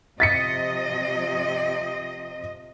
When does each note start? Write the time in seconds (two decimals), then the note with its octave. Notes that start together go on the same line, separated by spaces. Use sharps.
0.20 C3 F3 D#5 A6 B6 C#7